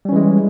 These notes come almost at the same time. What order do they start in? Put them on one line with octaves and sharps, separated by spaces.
G3 C#4 E3 G#3